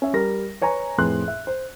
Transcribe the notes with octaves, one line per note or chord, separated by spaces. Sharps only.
C#4 E5
G3 A#4 A#6
B4 C#5 G#5 A#5
F2 A2 G#4 B4 C6 F#6
E5
C5